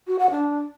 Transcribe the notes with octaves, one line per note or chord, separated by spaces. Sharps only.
F#4
F#5
D4